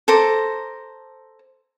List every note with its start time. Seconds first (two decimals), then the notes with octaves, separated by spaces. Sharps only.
0.08 A4 C5 A#5 D6